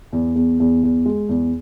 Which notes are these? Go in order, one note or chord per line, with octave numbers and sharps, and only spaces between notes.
E2
E2
E2
E2
G#3
E2